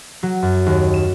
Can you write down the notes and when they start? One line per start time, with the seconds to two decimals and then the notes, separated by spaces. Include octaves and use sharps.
0.23 F#3
0.42 F#2
0.66 D#2
0.94 E7